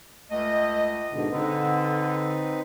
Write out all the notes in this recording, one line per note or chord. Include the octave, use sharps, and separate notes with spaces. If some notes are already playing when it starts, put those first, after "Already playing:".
C#2 A3 D#5
G#2 B2 D3
D3 C4 D#4 B4